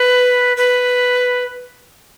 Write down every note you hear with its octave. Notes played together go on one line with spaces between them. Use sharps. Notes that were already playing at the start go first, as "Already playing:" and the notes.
Already playing: B4
B4